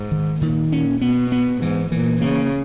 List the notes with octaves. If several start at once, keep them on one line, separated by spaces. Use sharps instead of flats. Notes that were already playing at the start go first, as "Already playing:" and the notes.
Already playing: G#2
D#3
A#2 D#3
A#2 C#4
B2 B3
B3
G#2 E3
A#2 E3
C#3 A#3